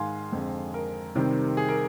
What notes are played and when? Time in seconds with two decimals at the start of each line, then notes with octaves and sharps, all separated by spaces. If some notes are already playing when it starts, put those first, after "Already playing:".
Already playing: G#2 D#3 G#3 F5 G#5 C6
0.32 F2 D3 G#3 C4
0.74 A#4
1.15 C3 D#3 G3 C4
1.57 G#4
1.69 A#4